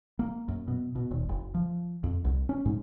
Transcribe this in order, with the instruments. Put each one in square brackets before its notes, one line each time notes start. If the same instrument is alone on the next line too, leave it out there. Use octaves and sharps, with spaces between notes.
[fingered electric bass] A#3
F#2
B2
B2
D#1
F#1
F3
F2
C2
C#4
G#2